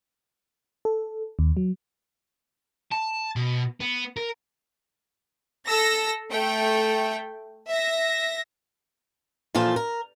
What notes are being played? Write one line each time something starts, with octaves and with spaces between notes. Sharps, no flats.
A4
D#2
F#3
A5
B2
B3
A#4
A4 E6 A#6
A3 G5
E5 A#6
A#2 E3 F3 F4 A4
A#4